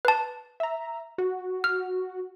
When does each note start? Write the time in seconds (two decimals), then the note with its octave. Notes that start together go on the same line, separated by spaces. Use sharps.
0.05 B4 A5
0.60 E5 A#5
1.18 F#4
1.64 F6